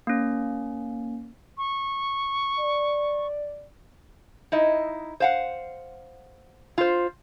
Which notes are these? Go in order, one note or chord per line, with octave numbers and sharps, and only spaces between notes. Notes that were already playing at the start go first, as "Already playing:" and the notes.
A#3 C#4
C#6
D5
D#4 E4 D#5
C5 F5 F#5
F4 C5